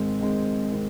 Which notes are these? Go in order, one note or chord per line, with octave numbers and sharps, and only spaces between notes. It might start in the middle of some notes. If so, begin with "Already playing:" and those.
Already playing: G#2 D#3 G#3 C4
G#2 D#3 G#3 C4
D#3 G#3 C4